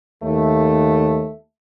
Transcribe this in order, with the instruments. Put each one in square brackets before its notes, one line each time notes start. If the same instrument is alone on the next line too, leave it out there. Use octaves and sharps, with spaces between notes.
[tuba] D#2 [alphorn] A3